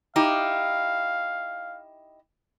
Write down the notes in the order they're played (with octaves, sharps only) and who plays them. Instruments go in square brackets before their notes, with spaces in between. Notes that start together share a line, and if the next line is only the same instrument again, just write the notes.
[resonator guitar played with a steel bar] D#4 E4 G4 [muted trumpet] F5